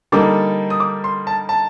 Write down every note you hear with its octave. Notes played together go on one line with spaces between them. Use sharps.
D3 G3 A#3 D#4 A4 D6
D#6
D6
C6
A5
A5